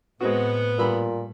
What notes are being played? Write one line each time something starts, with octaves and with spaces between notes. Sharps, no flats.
A2 G#3 B3 C4 F#4
G2 A#2 B5 E6